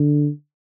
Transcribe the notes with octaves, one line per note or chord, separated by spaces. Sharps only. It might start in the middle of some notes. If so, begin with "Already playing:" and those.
Already playing: D3